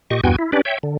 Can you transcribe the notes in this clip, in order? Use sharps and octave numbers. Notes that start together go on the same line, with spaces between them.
A#2 G4 D#5 C#6
E2 G2 B3 F#4 G5 G#5
E4
C#4 D4 G4 B4 D5
C#5 E5 G5
D3